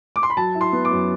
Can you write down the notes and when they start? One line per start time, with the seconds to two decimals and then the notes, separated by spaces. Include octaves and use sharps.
0.16 D6
0.23 C6
0.30 B5
0.37 F#3 A5
0.55 E4
0.61 C6
0.73 B3
0.85 D6
0.91 F#2